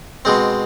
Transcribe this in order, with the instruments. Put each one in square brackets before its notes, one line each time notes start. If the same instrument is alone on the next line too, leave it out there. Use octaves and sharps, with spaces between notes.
[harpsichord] B2 G#3 C4